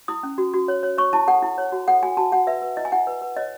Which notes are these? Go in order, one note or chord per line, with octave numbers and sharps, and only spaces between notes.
E4 D#6
C#4
F#4
F#4
C#5
C#5
C#5 C#6
E4 A5
A4 F#5
E4
C#5
F#4
A4 F#5
F#4 G#5
F#4 A5
F#4 F#5
B4 E5
B4
E4 D#5
G#5
E4 F#5
B4
B4
C#5 D#5